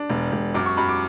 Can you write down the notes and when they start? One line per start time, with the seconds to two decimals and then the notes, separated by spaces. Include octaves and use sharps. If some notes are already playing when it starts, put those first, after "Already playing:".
Already playing: D4
0.10 E1
0.32 E1
0.54 F#2 D6
0.66 C#6
0.77 F#2 B5
0.89 D6